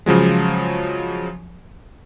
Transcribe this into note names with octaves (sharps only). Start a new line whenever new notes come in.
C#3 F3 F#3 G#3